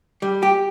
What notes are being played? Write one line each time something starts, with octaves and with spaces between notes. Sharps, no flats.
G3
G4